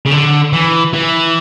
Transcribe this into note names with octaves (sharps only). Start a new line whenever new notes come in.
C#3
D3
E3
E3